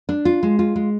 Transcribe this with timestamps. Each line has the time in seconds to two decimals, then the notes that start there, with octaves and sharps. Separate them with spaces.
0.09 D4
0.25 F4
0.43 G#3
0.59 F4
0.76 G#3